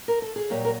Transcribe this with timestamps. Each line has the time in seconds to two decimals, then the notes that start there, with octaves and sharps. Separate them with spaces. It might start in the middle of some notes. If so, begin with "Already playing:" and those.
0.08 A#4
0.22 A4
0.36 G#4
0.50 A#2 F#3 G3 A#3 G4
0.65 A#4